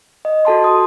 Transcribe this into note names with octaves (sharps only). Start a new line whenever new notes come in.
D#5
F#4 A4 A5 C6
C6 D#6